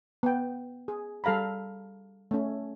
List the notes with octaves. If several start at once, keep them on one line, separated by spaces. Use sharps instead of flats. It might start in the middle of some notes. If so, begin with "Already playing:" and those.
B3 G5
G#4
G3 A4 F5 A#5 B5
A3 C#4